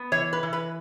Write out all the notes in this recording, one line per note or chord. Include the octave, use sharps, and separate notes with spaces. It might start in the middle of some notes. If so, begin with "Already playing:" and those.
Already playing: B3
E3 C#5
B4
E3
B4